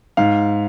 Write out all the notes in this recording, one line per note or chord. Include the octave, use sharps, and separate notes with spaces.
G#2 F5